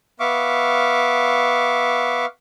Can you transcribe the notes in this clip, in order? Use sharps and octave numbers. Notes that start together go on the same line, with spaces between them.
B3 E5 F5 C#6 D6